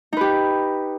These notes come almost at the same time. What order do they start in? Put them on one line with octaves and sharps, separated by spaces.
D#4 B4 G4